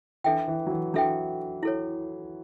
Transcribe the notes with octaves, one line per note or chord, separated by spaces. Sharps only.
E3 D4 A4 E5 G5
E3
F#3
E3
F#3 D4 A4 E5 G5
E4 A4 C#5